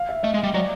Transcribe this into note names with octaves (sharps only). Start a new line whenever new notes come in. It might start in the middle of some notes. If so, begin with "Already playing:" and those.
Already playing: F5
E5
A3 D#5
G#3
G3
F#3 D5